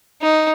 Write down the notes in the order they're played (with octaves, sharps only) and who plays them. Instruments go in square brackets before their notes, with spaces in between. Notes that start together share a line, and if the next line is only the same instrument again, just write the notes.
[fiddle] D#4